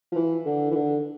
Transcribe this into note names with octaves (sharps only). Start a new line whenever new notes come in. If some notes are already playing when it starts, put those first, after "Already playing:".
F3
E3
D3
E3
D3